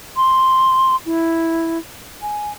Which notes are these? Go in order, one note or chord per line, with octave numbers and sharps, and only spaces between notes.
C6
E4
G#5